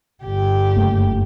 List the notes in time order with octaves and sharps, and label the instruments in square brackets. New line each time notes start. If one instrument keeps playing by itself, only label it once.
[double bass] G1 [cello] G4
[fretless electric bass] F#1 A3